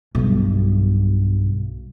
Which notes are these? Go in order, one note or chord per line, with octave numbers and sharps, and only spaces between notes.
B1 G2